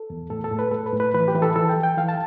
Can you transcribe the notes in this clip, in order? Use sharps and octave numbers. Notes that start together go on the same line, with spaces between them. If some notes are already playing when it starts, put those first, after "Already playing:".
Already playing: A4
E2
A2 A4
A4
A2
B4
A2 A4
B4
A2
B4
E3 B4
G4
E3 B4
A4
E3 A4
G5
E3
G5
E3 F5
A5